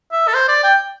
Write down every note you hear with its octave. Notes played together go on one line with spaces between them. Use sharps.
E5
A4
C5
D5
G5